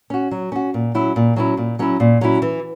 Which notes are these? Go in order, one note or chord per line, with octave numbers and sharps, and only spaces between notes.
C#4 F#4
F#3
C#4 F#4
A#2
F#3 C#4 E4
A#2
F#3 C#4 E4
A#2
F#3 C#4 E4
A#2
F#3 C#4 E4
E3